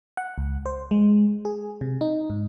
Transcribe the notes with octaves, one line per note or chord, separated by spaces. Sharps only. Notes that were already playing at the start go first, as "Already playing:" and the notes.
F#5
C#2
C5
G#3
G#4
C3
D#4
G#2